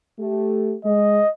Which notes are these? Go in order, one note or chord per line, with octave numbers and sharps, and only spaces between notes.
A3 G4
G#3 D#5